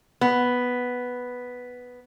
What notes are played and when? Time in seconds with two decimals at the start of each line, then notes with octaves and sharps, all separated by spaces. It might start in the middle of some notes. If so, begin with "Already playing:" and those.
0.21 B3